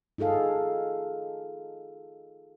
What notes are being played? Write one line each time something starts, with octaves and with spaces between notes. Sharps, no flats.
D#4 F4 G#4 A4 F5